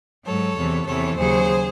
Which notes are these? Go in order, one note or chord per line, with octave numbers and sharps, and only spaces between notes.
G#2 F#3 A4 C#5
E2 C3 E3
E2 C3 E3 A4 C#5
D#2 C#3 F#3 G#4 C5